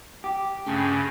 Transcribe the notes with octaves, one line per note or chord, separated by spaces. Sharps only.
G4
G2 C#3 A3 C#4 G#5